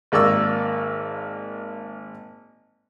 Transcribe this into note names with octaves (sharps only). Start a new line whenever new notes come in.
G#1 A#3 D5 C#6 E6